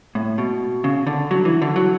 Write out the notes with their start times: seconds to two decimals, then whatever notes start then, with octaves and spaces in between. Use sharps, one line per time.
0.15 A2
0.38 B2
0.84 C#3
1.07 D3
1.31 F#3
1.45 E3
1.62 D3
1.76 F#3